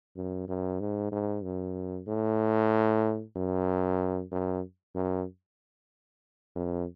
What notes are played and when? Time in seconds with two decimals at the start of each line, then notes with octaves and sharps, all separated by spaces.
0.16 F#2
0.48 F#2
0.80 G#2
1.12 G#2
1.43 F#2
2.07 A2
3.36 F#2
4.32 F#2
4.95 F#2
6.56 F2